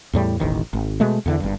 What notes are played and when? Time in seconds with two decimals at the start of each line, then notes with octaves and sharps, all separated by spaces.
0.13 E2 A2 G3
0.40 E1 A1 D#3
0.73 G#1
1.00 B2 G#3 A3
1.26 E2 D3 E3
1.40 G1 G2